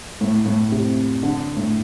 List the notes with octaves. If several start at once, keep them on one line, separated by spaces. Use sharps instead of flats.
A2
A2
C3
D3
A2